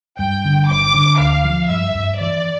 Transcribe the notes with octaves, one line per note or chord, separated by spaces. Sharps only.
G2 G5
D3
G1 D6
D3
D2 F5
F3
G2 E5
G2
E3 D5